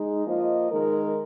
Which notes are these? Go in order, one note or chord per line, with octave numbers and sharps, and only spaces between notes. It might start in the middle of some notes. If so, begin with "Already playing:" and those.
Already playing: G#3 D#4
F3 A#3 F4 C5 D#5
D#3 G#3 D#4 A#4